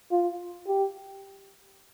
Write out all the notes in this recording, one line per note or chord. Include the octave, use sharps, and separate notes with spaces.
F4
G4